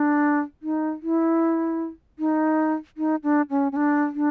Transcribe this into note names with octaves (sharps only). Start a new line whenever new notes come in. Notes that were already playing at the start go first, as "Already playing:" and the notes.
Already playing: D4
D#4
E4
D#4
D#4
D4
C#4
C#4
D4
D4